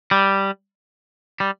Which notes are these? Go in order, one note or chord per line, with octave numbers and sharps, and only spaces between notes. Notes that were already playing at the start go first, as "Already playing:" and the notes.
G3
G3